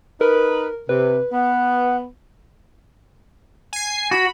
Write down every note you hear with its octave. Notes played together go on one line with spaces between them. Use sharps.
D#4 A#4 B4
C3 B4
B3 F#5
G#5 C7
F#4 B5